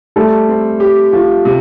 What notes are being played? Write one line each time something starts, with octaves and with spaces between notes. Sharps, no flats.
G3 A3 A4
C4
G4
F3
C3